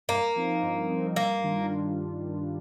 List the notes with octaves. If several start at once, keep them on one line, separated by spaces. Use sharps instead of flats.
G2 A#3
F3 C4 D#4
G2
F3 C4 D#4
G2 A#3
D#3 G3 D4 F4